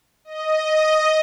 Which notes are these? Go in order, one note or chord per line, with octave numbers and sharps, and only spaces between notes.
D#5